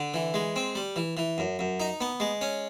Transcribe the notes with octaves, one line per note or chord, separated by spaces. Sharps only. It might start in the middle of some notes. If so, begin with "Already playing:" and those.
Already playing: D3
E3
G#3
C4
G3
E3
E3
F#2
F#2
D#4
B3
G#3
C#4